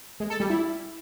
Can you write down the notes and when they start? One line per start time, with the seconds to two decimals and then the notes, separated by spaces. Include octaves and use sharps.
0.20 G#3
0.30 A4
0.40 G3
0.50 E4